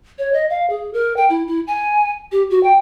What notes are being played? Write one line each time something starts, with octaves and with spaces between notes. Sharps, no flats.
C#5
D#5
F5
G#4
A#4
G5
E4
E4
G#5
G4
F#4
G5